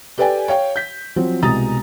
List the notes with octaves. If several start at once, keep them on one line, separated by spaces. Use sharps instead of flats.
G4 A4 B4 D5 G5 G#5
C#5 F5 G5
G6 B6
F3 F#3 C4
C2 B2 G#3 A#5 D#6 A6